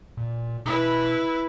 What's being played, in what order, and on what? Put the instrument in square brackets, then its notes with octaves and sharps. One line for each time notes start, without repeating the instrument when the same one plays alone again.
[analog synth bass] A#2
[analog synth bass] B2 [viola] E4 B4